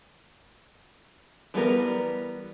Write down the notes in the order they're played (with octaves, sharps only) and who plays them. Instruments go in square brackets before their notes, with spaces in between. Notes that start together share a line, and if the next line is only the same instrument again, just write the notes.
[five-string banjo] E3 G3 B3 A#4